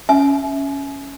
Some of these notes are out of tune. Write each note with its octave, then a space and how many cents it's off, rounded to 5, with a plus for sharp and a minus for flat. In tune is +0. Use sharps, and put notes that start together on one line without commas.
C#4 +0 E5 -5 G#5 +35